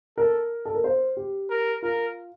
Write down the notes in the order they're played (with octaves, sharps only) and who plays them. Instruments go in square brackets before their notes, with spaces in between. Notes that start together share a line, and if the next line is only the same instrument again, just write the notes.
[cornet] A4 [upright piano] A#4
[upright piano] A4
A#4
C5
G4
[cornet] A#4
[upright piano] F4 [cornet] A#4